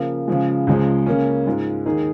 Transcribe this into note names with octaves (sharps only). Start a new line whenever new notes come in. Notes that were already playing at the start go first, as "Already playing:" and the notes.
Already playing: C#3 F3 A#3
C#3 F3 G#3
C#2 C#3 F3 G#3
C#3 A#3 C#4
G#2 G#3 F4
D#2 D#3 A#3 D#4 G#4